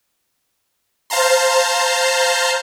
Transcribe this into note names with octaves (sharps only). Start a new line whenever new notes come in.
C5 F5 A5 A#5 C6